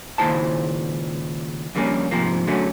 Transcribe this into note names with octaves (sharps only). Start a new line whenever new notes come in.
C#2 A#2 D#3 E4 C5 A5
F2 D3 G3 A#3 C#4
G#2 C3 F3 A#3
D3 F#3 A3 C#4